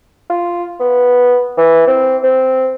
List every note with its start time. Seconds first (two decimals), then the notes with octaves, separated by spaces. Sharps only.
0.30 F4
0.80 B3
1.57 E3
1.87 C4
2.23 C4